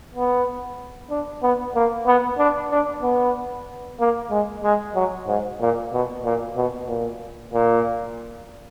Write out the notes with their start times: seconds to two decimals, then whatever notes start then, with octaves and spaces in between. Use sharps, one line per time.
0.14 B3
1.10 D4
1.42 B3
1.75 A#3
2.06 B3
2.38 D4
2.71 D4
3.03 B3
4.00 A#3
4.31 G#3
4.63 G#3
4.95 F#3
5.27 G#2
5.60 A#2
5.92 B2
6.25 A#2
6.56 B2
6.88 A#2
7.53 A#2